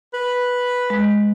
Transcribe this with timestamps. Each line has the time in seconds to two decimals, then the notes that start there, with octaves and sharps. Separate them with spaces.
0.13 B4
0.90 G#3